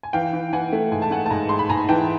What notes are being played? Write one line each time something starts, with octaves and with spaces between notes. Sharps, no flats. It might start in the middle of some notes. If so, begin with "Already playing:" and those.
G#5
E3 F5 G5
E3
E3 F#5 G#5
A3
G#2 G#5
A5
A3 F#5 G#5
A5
G#2 G#5 A#5
G#2 C6
B5
G#2 G#5 A#5
E3 G5 A5